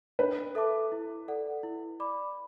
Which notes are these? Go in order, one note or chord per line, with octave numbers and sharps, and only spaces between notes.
D4 B4
A4 E5 A5 D6
E4
A4 D5 F#5
E4
D5 B5 D6